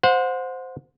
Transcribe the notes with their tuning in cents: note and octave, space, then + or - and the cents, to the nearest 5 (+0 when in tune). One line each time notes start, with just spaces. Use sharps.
C5 -5 F#5 -35